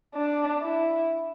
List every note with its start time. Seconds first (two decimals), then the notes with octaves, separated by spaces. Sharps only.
0.15 D4
0.62 E4